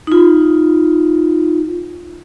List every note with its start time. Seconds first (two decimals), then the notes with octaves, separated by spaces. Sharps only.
0.07 D#4 F4